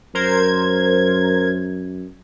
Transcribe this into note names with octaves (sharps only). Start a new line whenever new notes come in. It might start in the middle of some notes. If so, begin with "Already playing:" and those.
F#2 A#4 C5 G#6